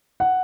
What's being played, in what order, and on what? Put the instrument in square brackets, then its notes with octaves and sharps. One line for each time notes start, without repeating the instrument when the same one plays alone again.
[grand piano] F#5